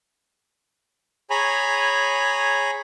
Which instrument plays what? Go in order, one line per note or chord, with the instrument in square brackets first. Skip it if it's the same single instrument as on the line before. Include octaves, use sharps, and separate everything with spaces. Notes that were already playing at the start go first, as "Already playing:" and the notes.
[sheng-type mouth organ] G#4 C#5 G#5 A#5 B5